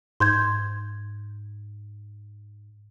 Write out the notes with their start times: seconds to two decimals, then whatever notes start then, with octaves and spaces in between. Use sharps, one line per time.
0.20 G#2 C6 G6 G#6